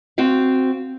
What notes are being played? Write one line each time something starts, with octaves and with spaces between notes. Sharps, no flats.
C4 F#4 F5